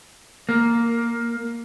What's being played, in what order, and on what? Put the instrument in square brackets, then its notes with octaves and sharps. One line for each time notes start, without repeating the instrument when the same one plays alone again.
[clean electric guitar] A#3